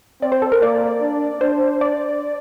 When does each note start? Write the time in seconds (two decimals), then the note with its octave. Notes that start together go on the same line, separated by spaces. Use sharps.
0.22 C4 D5
0.32 C5
0.42 A4
0.52 A#4
0.62 A#3 D5
1.01 D4
1.41 D4 C5
1.81 D5